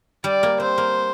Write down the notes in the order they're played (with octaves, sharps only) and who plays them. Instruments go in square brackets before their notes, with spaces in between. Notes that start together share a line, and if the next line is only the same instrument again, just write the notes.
[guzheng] G3 [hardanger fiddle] D5
[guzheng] A#3
[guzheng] C4 [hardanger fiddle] C5
[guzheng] A#3